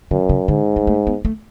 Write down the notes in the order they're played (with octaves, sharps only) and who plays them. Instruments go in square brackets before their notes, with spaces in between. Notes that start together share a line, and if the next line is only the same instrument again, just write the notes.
[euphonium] F#2 [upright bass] D3
[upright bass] C#3
[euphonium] G#2 [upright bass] D3
[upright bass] G#3
A3
B3
A3